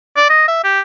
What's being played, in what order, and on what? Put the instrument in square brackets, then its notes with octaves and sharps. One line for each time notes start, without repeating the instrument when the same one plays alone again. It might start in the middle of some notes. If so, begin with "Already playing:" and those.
[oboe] D5
D#5
E5
G4